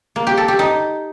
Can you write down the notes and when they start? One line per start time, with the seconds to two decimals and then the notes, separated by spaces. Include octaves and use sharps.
0.16 A#3
0.27 G4
0.37 A4
0.48 G4
0.59 D#4